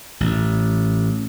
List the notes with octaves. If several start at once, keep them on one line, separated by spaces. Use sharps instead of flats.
A1